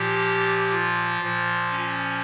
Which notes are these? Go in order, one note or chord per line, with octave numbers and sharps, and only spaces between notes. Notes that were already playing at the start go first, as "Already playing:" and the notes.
Already playing: A#2 F3 G4
F4
A#2 F3
C#4